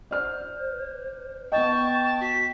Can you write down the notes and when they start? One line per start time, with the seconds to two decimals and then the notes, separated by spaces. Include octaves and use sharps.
0.11 C5 D5 F6
1.52 B3 D#5 G5 A5 C#6
2.21 F#4 B6